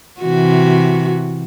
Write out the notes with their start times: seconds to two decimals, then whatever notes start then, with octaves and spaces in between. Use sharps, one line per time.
0.21 C3 E3 F#4